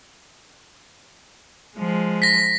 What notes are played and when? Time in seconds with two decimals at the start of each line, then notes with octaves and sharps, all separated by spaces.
1.77 F3 G#3
2.22 A#6 B6